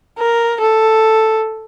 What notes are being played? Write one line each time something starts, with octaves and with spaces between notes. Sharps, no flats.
A#4
A4